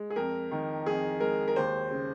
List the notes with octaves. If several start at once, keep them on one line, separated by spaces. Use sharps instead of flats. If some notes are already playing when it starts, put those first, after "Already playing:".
Already playing: G#3
G#4
F2 A#4
D#3
F2 G#4
G#3 A#4
A#4
D#2 C5
C#3